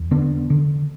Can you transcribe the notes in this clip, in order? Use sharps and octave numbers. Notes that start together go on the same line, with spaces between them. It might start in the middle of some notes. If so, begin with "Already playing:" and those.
Already playing: E2
D3 B3 D4
D3